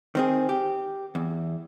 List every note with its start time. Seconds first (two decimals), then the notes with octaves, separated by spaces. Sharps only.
0.15 D#3 C4 G#4
0.49 G4
1.15 E2